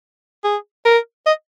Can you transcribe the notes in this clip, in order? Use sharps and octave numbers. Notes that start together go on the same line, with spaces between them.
G#4
A#4
D#5